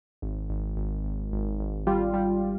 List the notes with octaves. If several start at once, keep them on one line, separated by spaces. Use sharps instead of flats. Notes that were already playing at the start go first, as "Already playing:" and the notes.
G#1
G#1
G#1
G#1
G#1
G#1
G3 F4
G3